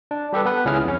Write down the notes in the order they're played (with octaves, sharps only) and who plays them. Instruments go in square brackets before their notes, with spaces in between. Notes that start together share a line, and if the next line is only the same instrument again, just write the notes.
[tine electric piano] D4
G3 G4 A4 B4
B3 B4
C#2 C#4 E4 G#4 F6
F2 C#4